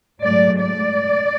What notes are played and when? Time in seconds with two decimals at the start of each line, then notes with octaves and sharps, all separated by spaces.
0.23 G#2 F#3 A3 D5
0.59 D5